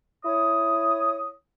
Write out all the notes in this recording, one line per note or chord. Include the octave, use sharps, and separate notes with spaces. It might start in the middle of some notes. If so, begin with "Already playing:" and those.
E4 C#5 D#6